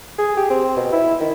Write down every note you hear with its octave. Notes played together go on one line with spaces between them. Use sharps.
G#4
G4
C4
B2
E4
D#3